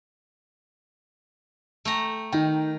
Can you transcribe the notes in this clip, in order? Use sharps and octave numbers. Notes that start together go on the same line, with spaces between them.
A3 G5 A#5
D#3 D#4 G5